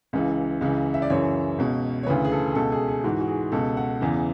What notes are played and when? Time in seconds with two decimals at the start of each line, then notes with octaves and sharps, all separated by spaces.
0.13 C#2 C#3 E3
0.61 C#2 C#3 E3
0.94 E5
1.02 D5
1.10 F#2 C#3 E3 C#5
1.58 C#2 B2
2.03 C#5
2.06 D2 C#3 E3 B4
2.25 G#4
2.32 A4
2.55 C#2 B2 A4
2.72 G#4
2.88 G#4
3.04 G#2 E3 F#4
3.21 F#4
3.28 G#4
3.52 C#2 B2 A4
3.77 F#5
4.01 E2 C#3 E3